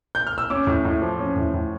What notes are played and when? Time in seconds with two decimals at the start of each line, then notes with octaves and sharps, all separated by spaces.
0.15 G6
0.27 F6
0.38 E6
0.50 C#4 D6
0.67 A2
0.85 A2
1.02 F3
1.19 C#4
1.36 A2
1.54 A2